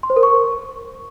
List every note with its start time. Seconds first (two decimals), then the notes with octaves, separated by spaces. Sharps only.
0.03 C6
0.10 C5
0.16 A#4
0.23 C#6